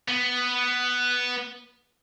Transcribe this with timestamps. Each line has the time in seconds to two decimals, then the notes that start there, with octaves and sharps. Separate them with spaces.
0.08 B3